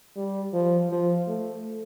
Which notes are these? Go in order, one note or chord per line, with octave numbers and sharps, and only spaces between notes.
G3
F3
F3
A3